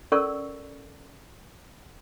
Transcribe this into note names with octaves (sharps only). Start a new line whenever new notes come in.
C#4 A4 A#4 D5 C#6 E6